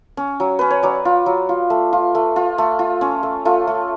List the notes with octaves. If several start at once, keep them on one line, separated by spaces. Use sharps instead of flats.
C#4
F#3
C#4 B4
C#5
F#3 D5
F4
F#3
F4
A3
F4
A3
F4
A3
F4
C#4
A3
A3 F4
A3